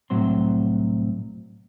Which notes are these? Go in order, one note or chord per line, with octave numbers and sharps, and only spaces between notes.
C2 A2 F#3 C4 C6